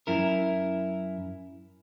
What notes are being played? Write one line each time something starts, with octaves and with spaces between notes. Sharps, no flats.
F#2 E4 A#4